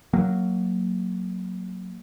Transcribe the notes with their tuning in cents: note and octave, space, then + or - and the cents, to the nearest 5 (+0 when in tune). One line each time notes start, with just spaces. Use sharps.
F#3 +0 A#3 -10